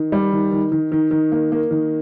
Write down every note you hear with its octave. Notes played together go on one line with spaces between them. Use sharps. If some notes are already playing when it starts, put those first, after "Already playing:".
Already playing: D#3
G3
D#3
D#3
D#3
D#3
D#3
A#3
A#3
D#3